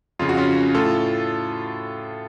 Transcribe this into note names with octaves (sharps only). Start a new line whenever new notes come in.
F2 C#3 F4
F#4
C#4 F4
A2 F4 A4